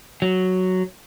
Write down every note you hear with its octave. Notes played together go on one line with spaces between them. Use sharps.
F#3